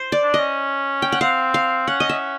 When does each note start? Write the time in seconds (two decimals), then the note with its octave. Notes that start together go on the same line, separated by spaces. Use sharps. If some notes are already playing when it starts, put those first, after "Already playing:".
Already playing: C5
0.12 D5
0.23 D4
0.34 D#5
0.39 C#4
1.02 G5
1.12 F#5
1.21 C4 F5
1.54 F5
1.87 C#4 F#5
2.00 D#5
2.09 E5